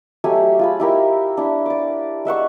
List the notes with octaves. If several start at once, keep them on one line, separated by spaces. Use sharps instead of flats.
F#3 A3 G4 G#5
F4 G#4 B5
E4 G4 A#4
D4 E4
D5 D6
G#3 E5 F#5 C#6